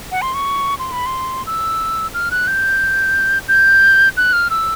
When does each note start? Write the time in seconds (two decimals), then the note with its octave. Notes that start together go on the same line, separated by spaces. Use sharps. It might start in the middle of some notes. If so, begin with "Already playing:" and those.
0.12 F#5
0.22 C6
0.34 C#6
0.79 C6
0.92 B5
1.06 C6
1.46 E6
2.14 F6
2.31 F#6
2.47 G6
3.48 G6
4.17 F#6
4.33 F6
4.50 E6